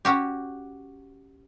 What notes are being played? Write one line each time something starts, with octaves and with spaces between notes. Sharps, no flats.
C#4 F#4 G4